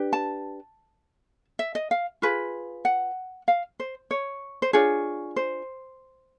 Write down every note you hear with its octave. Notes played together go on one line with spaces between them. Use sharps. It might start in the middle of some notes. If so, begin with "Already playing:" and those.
Already playing: D4 G4 B4
A5
E5
D#5
F5
F4 G#4 B4
F#5
F5
C5
C#5
C5
D4 F4 G#4 C#5
C5